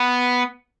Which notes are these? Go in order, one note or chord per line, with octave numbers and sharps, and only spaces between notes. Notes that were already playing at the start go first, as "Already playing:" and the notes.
Already playing: B3